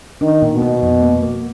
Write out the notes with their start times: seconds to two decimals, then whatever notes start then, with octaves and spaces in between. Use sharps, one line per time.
0.21 D#3 D4
0.42 A#2
0.52 B2
0.62 B3
0.82 F2
1.02 A#3
1.23 A#3